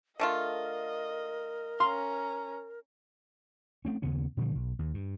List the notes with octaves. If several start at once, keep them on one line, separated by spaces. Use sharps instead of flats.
D3 A3 F4 A#4 D#5
C#4 F5 A#5 C6
A3 C4 C#4
D#2 C#3 B3 C#4
A#2 D3 F3 G3
B1
D#2
G2